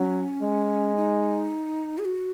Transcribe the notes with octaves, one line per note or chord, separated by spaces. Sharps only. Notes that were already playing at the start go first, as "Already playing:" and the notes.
Already playing: F#3 C#4
G#3
D#4
G#4
F#4